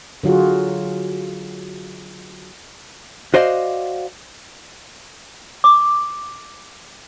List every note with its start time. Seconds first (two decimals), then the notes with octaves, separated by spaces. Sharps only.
0.24 D3 F#3 F4 F#4 G#4
3.34 F#4 C5 D5 D#5 F5
5.64 D6